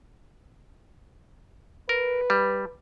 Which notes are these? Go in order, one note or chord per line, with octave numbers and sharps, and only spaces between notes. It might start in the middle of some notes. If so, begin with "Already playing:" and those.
A#4 B4
G3